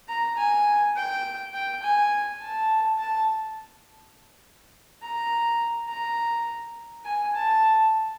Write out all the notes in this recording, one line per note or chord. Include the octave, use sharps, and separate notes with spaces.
A#5
G#5
G5
G5
G#5
A5
A5
A#5
A#5
G#5
A5